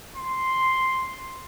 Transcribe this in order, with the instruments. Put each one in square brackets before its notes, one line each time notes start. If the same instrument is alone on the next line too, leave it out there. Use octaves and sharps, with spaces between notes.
[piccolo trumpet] C6